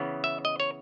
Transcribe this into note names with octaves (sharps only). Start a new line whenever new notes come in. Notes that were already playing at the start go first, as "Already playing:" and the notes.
Already playing: C#3 E3 B3
E5
D#5
C#5